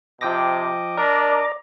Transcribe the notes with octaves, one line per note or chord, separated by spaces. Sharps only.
C3 F3 D#5 G5 D6 A#6
D4 A#4 D5 A#5